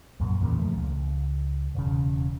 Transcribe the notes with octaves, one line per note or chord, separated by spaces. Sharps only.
C2 F#2 A#2
E2 A#2 C#3
F3 A3
C#2
E1 C#3